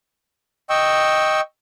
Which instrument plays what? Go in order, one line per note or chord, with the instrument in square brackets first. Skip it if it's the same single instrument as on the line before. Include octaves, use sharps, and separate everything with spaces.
[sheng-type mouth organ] D#5 G5 C#6 E6